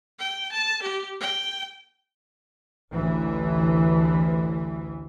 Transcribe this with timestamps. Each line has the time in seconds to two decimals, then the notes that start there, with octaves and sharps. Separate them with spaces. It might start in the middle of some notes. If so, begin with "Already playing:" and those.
0.19 G5
0.52 A5
0.82 G4
1.20 G5
2.92 A1 D2 E3